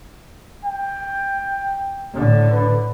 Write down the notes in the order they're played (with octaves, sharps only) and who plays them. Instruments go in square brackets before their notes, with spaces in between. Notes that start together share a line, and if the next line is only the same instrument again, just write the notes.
[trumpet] G5
[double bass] A2 D3
[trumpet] B4